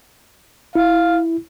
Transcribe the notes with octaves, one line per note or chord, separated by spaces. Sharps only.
E4 F5